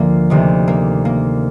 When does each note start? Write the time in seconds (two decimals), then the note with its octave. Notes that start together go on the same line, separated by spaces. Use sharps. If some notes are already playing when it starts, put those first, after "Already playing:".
Already playing: D2 D3 F3 A#3 D4
0.30 D2 C3 D#3
0.68 A#3
1.05 A#3